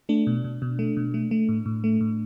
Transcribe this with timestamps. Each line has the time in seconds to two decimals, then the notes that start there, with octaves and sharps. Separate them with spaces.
0.09 A3 D4
0.27 B2
0.44 B2
0.62 B2
0.79 A3
0.97 B2
1.14 A3
1.31 A3
1.49 A2
1.66 A2
1.84 A3
2.01 A2